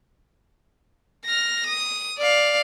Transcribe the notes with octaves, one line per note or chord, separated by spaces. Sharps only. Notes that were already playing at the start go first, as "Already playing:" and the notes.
F6 A#6
D#6
D5 F5